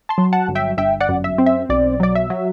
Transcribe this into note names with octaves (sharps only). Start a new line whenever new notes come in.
A5 C6
F#3
F#5 A5
G1
E5 G5
G1 E5 G5
D5 F#5
F#2
E5
C4
E5
B1 D5
F#3 D5
E5
F#3